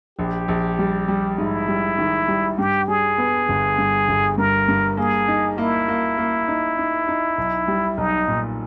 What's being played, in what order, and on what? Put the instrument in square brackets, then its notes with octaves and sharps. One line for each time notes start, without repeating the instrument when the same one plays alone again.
[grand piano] A#1 [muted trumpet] G4
[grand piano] A#1
G3
G3
[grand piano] G#2 [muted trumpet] E4
[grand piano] G3
D#3
G3
[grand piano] G2 [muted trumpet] G4
[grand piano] G3 [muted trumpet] G#4
[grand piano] B3
G1
G2
G1
[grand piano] G2 [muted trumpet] A#4
[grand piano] G2
[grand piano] A#3 [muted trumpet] G#4
[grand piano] D#4
[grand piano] A#3 [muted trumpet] E4
[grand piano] A#3
A#3
D#4
D#4
D#4
B1
G3
[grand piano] B1 [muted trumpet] D#4
[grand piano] A#2